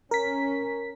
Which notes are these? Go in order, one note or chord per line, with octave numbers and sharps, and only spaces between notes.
C#4 A#4 B6